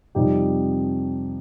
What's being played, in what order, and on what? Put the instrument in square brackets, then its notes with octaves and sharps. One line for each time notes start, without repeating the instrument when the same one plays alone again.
[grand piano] F2 C3 G3 D#4 G4